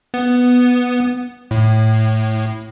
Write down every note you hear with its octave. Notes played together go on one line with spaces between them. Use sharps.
B3
A2